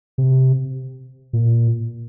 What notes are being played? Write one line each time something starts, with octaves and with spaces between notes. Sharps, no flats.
C3
A#2